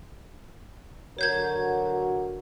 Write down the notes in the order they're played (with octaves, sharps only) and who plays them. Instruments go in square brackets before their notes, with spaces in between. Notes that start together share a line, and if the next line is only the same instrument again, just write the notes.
[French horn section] D3 F#3 F#4 [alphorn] A#4 [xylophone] C#5 G6 G#6